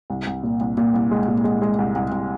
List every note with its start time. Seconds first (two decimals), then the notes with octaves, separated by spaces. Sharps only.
0.10 C2
0.27 C2
0.43 A#2
0.61 C2
0.77 A#2
0.94 C2
1.11 G#3
1.28 A#2
1.44 G#3
1.62 G#3
1.78 C2
1.95 C2
2.12 C2